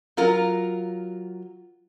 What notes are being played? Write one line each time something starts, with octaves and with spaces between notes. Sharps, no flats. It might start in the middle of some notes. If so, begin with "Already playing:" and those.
F#3 F4 A#4